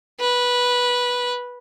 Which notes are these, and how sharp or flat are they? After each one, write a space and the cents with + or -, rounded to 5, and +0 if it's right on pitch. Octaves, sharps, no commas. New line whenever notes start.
B4 -10